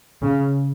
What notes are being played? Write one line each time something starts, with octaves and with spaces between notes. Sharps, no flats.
C#3